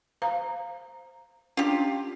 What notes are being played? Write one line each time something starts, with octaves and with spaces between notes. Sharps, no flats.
C5 F5 A#5
C#4 D4 F4 G4